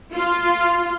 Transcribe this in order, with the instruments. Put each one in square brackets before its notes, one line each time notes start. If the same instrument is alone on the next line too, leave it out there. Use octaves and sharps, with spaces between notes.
[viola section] F4